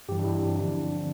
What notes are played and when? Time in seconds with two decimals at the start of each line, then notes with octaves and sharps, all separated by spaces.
0.09 G2 E3 G4
0.19 D4
0.24 E4
0.39 C4
0.55 E2 D3 F3 D4
0.79 C4